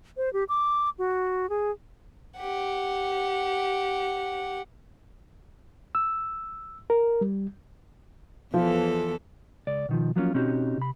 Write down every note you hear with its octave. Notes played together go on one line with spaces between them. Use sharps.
C5
G4
D6
F#4
G#4
G4 F#5
E6
A#4
G3
E2 E3 F3 A4
C#2 D5
B2 D#3 F3
F3 F#3 A#3 B3 C#4 F4
B2 C4 C#4 D#4 F#4 G4
C3 B5